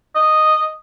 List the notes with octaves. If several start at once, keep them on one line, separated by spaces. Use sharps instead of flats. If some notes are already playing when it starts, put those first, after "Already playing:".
D#5